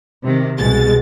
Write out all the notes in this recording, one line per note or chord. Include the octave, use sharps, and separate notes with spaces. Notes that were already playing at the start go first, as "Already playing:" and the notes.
C3 D#3
C2 B2 G#3 A6